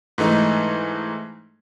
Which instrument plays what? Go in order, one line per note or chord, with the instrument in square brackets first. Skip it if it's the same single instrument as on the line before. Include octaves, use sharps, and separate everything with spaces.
[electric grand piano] G#2 E3 A3 D#4